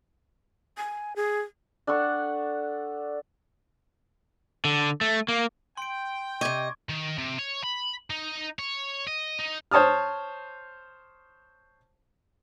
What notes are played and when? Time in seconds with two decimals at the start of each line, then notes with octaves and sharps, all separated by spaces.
0.77 G#5
1.16 G#4
1.87 D4 A4 F#5 C#6
4.65 D3
5.01 A3
5.28 A#3
5.77 G5 C6 D7
6.41 C3 D#5 C#6 D6 G#6
6.89 D#3
7.18 C3
7.39 C#5
7.64 B5
8.10 D#4
8.59 C#5
9.07 D#5
9.39 D#4
9.71 C5 C#5 A5 D#6 F6